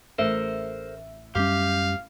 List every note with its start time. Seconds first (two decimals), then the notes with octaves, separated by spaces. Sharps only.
0.18 A1 A4 A#4 C5 E5
1.35 F#2 G3 C#4 G4 F5